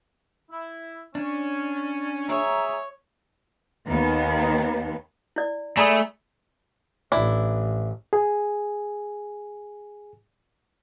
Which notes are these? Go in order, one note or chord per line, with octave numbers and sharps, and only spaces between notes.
E4
C#4 D4
G#4 C#5 E5 A#5
D#2 D#3 B3
E4 D5
A3 G#4 D5 E5 A#5 B5 D#6
A1 D4 E4
G#4 G#5